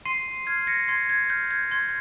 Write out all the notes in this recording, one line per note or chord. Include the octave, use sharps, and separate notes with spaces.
C6 C7 D#7
F6 G#6 C7
A#6 C#7
C6 G#6 C7
G#6
F6 G6
G#6
C6 G#6